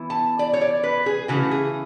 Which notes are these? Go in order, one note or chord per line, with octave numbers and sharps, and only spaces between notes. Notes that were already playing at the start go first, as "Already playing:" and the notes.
Already playing: E3 B3 E4
A5
D5
C#5
D5
B4
G#4
C#3 E3 A3 F#4
G#4